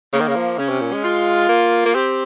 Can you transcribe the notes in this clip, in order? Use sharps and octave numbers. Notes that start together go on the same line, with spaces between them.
C#3 A#3
D#3
C#3
F3
C#3 C#4
C3
A#2
G#3
F4
A#3
A#3
C4 G4